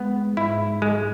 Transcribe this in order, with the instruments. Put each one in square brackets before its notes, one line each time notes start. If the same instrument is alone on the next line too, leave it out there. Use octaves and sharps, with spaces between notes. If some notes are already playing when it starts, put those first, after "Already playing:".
Already playing: [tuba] G#3 [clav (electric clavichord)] B3
[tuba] G#2 [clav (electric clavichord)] E4
[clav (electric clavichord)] G#3